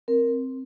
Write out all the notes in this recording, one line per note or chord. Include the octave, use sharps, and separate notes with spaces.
C4 A#4